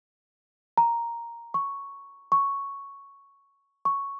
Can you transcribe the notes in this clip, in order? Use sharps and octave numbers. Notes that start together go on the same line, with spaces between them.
A#5
C#6
C#6
C#6